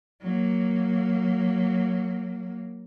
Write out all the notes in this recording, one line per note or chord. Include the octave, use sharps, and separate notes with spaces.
F#3 A#3